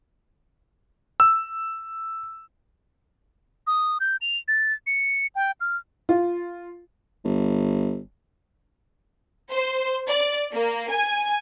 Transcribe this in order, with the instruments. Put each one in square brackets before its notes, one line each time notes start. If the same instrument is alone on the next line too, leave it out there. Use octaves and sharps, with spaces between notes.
[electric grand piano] E6
[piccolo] D#6
G6
F7
A6
C#7
G5
F6
[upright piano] F4
[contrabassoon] G1
[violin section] C5
D5
A#3
G#5